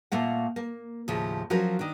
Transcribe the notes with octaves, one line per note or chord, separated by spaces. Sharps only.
A#2 A3 A#3 F#5
A#3
D#2 A2 C#3 F3
F3 F#3 C#4 F#4 A#4
D#3 D4